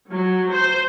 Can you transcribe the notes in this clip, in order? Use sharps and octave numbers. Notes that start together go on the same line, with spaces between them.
F#3
C5